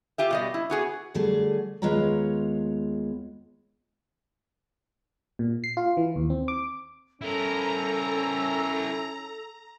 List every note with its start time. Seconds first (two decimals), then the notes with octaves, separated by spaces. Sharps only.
0.18 F4 G4 E5
0.31 B2 G3 D#5
0.54 E4
0.70 B3 F#4 G#4
1.14 D3 F#3 G3 A3 G#4
1.82 D#2 G#3 B3 F4 C#5 A#5
5.39 A#2
5.64 C7
5.77 F4
5.97 E3
6.16 D#2
6.30 C4
6.48 D6
7.21 C#4 E4 A4 A#4 A#5